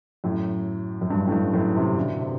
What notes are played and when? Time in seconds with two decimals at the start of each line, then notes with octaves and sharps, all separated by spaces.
0.24 F#2 A2
1.01 F#2
1.10 G2
1.27 A2
1.32 G2
1.53 F#2 A2
1.75 C3 E3
1.97 B2 D3
2.20 C3